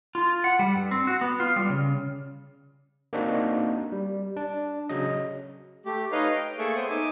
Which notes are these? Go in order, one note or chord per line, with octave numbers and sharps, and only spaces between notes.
F4
F#5
G3
G2
C4
F#4
B3
F4
G3
C#3
A#3 C4 D4 D#4 F#4
G3
D4
C#3 F#3 D#5
A3 G4
D#4 B4 C#5 D#5 F5 A#5
G5
A3 A#3 G#4 A4 E5 C#6
B3 C5 C#5 G5 D#6
D#4 E5 G#5 D6